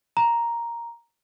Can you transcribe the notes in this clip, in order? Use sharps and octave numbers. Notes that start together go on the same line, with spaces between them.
A#5